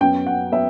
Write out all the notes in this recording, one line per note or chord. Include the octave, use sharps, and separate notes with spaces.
F#2 F#3 B3 G5
F#5
F#3 B3 E5